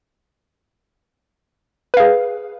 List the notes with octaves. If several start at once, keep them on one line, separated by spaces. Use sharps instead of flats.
G#4 B4 F5